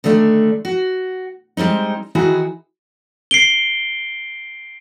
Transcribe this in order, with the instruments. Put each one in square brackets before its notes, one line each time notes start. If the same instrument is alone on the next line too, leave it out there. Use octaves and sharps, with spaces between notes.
[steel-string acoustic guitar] D3 D#3 A3 D4
F#4
G3 G#3 C4 D#4
D#3 E3 E4 F#4 G#4
[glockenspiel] C7 D7 G7